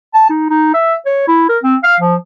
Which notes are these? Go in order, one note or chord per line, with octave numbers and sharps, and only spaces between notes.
A5
D#4
D#4
E5
C#5
E4
A#4
C4
F5
F3